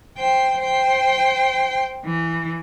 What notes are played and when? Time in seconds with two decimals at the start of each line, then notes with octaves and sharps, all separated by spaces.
0.18 C5 G5
0.58 C5 G5
2.05 E3